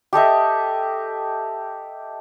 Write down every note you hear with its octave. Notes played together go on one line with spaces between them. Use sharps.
G4 A4 D#5 E5